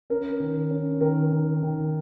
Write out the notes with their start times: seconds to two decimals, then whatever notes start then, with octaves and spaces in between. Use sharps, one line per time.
0.10 C#4 A#4
0.40 D#3
0.71 C#4
1.01 D#3 A#4
1.32 D#3
1.63 D#3